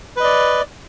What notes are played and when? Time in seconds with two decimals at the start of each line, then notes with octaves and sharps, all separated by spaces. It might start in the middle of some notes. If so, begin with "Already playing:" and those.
0.17 B4
0.20 D#5
0.24 D5